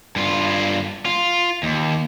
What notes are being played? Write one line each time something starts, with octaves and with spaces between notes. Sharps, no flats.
G2 F4
F4
D#2